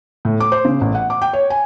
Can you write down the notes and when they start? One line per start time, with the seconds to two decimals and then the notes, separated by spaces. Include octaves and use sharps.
0.25 A2
0.40 D6
0.52 C5
0.65 C#3
0.81 A1
0.95 F#5
1.10 D6
1.22 G5
1.33 C#5
1.50 G#5